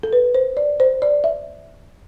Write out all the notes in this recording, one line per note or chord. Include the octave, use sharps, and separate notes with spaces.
A4
B4
C5
D5
C5
D5
E5